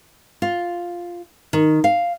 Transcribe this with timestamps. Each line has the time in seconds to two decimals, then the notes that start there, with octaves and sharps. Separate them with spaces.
0.42 F4
1.53 D#3
1.84 F5